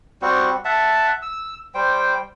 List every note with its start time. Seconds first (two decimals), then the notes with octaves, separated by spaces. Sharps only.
0.22 G3 C4 F#4
0.65 E5 F#5 A5
1.22 E6
1.74 G3 C5 G5